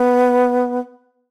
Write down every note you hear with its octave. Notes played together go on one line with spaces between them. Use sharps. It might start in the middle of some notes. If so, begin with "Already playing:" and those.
Already playing: B3